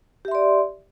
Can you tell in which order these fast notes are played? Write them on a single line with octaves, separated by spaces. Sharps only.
G4 E5 C6 D5